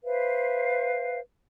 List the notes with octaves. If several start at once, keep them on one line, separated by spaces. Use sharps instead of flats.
B4 C5 E5 F5